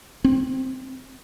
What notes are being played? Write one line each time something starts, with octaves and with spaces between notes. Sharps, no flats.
C4